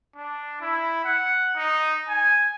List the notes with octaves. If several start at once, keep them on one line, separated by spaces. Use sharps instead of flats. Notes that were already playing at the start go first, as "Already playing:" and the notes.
D4
E4
F#5
D#4
G#5